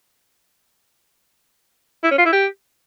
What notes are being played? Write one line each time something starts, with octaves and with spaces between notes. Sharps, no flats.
E4
C#4
F4
E4
G4